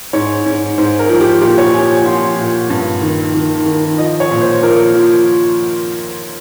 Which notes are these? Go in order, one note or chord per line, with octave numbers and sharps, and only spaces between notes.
G#2 C#5
G#2
G#2 C5
A#4
F3
G4
A#2 G4
C#5
F3 G#5
F3 C6
A#2
G2
D#3
D#3
D#3
F3 D#5
C#5
A#2
C5
F3 A#4
F3